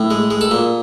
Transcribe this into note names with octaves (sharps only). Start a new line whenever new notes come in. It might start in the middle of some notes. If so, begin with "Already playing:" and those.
Already playing: A2
G#3
G#3
A4
A#2